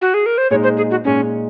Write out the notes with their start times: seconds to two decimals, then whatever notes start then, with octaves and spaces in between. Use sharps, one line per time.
0.02 F#4
0.14 G#4
0.26 A#4
0.38 C5
0.50 A#2 G#3 D#4 C#5
0.64 C5
0.77 G#4
0.91 F#4
1.04 A#2 G#3 C#4 D#4